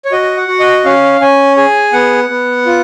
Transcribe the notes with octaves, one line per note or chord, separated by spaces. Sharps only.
C#5
F#4 D#5
F#5
F#4
D#5
C#4 F5
C#4 G#5
G#4 G#5
B3 F#5
B3
F4